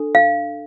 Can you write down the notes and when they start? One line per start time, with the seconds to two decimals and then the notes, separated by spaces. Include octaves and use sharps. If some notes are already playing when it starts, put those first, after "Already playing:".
Already playing: D4 A4
0.15 F5